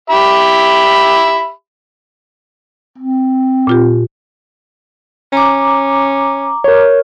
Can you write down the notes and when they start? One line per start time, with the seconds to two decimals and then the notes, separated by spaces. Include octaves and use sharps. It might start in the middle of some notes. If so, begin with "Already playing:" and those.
0.10 G4 E5 B5
2.98 C4
3.67 A#2 F4 G4
5.33 C#4 A#5 D6
6.64 A#4 C#5